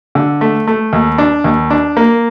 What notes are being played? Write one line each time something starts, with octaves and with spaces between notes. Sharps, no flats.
D3
A3
A3
D#2
D4
D#2
D4
A#3